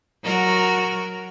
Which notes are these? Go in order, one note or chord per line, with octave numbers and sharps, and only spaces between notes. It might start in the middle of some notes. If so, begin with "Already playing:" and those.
F#3 F#4 A#4